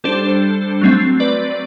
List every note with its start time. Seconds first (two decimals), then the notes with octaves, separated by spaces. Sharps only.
0.04 G3 D4 A4 C5
0.81 F#3 A3 C4
1.20 B4 D5